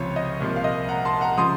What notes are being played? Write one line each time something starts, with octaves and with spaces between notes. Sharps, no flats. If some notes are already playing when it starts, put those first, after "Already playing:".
Already playing: C#2 C3 F3 C#5
D#5
C2 A#2 F3
F5
D#5
F#5 A#5
A5 C6
F#5 A#5
C#3 F3 C6 D#6